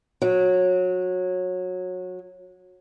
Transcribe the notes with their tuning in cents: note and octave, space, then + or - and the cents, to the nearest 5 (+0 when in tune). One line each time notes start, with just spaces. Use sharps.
F#3 -20